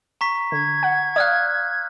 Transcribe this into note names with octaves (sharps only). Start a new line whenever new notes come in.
A#5 C#6 B6
D3 G#6
F#5
D5 F5 D#6 F6 F#6